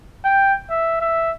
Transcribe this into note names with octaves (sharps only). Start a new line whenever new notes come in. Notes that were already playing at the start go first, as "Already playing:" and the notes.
G5
E5
E5